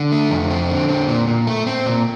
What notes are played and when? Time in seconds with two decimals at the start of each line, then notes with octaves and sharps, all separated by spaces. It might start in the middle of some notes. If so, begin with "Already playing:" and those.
Already playing: D3
0.12 A3
0.31 F2
0.50 C4
0.70 D3
0.89 C4
1.08 A#2
1.27 A#2
1.47 A3
1.67 C4
1.86 A#2